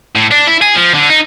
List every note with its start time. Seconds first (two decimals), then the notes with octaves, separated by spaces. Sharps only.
0.16 A2
0.31 D4
0.47 E4
0.62 G#4
0.76 F3
0.94 D3
1.09 D#4